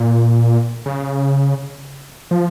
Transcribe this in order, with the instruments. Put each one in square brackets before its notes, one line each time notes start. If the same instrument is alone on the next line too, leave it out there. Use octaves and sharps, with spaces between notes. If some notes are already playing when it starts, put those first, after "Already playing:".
Already playing: [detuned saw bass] A#2
C#3
F3